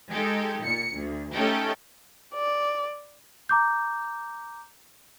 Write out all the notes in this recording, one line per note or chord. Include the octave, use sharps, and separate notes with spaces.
G#3 D#4 G4 A4
A#2 C#7
D2
A3 C#4 D#4 G4 A4
D5
A#5 D6 G6